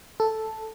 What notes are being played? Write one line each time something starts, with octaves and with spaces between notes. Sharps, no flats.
A4